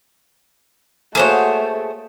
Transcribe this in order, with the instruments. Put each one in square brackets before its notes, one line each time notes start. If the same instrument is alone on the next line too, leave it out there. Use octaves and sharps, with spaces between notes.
[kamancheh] A3 [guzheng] A#3 F#4 [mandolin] G#4 C5 C#5